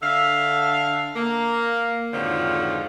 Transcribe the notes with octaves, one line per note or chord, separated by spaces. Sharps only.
D3 E5 F5
A#3
F2 G#2 D3 D#3 F3 F#3